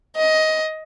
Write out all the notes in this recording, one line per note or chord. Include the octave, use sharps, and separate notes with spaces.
D#5